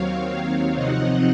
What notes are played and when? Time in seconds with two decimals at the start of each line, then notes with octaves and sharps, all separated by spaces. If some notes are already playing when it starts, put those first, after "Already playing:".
Already playing: D#2 D#3 F#3 C4 C#5 F5
0.75 C3 F3 C4 D#4 D#5 F#5